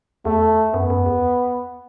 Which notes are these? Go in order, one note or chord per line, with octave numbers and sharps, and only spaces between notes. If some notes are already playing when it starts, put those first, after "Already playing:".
E2 A3
F#2 B3
F#2
E2